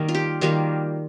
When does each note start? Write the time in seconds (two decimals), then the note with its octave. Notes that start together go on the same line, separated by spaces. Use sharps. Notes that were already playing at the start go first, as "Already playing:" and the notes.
Already playing: D#3 G3 A#3
0.09 F4
0.15 G4
0.41 D#3 G3 A#3 F4